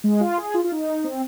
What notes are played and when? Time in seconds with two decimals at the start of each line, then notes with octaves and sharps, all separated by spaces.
0.04 G#3
0.20 F4
0.38 G#4
0.54 F4
0.64 F4
0.72 D#4
1.04 C4